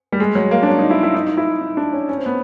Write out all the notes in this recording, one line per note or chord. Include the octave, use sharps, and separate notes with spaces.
G3
G#3
F#3
A#3
D4
C#4
D#4
E4
E4
D#4
D#4
E4
D#4
D4
C#4
C#4
C4
B3